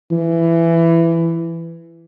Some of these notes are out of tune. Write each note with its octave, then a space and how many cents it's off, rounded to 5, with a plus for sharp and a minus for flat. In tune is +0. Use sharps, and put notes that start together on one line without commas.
E3 +15